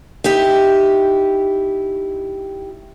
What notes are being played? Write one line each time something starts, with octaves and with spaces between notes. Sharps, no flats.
D#4 E4 G4